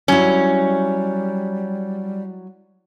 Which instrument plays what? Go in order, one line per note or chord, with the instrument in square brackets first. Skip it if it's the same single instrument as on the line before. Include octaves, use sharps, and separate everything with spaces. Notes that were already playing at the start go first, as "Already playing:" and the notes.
[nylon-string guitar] F#3 E4 [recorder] G3 [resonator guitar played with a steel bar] C#4